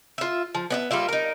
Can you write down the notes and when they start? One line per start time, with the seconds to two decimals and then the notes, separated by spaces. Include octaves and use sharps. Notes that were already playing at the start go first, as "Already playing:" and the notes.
0.18 F4 E5
0.55 F3
0.70 B3 D#5 E5
0.91 G3 A#3 F4 E5
1.09 D#4 A#4